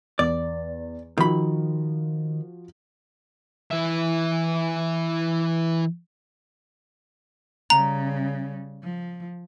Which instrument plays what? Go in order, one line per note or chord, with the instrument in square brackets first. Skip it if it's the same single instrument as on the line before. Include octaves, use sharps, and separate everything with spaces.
[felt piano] E2 [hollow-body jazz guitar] D5
[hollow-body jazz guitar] D#3 B5 [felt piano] F3 F#4
[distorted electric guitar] E3 E5
[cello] C#3 G3 [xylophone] A#5
[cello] F3